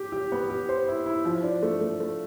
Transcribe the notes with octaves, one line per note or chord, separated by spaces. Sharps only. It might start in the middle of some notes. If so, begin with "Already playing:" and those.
Already playing: G4
G4
B3
G4
C5
E4
E4
F3
D4
A3
A3
A3